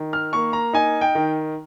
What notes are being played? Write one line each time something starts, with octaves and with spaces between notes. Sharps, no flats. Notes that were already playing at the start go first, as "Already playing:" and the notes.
Already playing: D#3
F6
A#3 C#6
A#5
D#4 G#5
G5
D#3